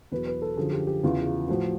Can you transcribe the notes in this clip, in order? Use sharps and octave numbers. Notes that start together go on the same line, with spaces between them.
E2 B2 F#3 B4
B4
A4
F#2 D3 F3 G#4
G4
G4
E2 C#3 E3 F4
A2 F3 F#4